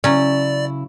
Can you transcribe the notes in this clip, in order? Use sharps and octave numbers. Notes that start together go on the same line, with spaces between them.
C#3 F#3 C#4 E4 D5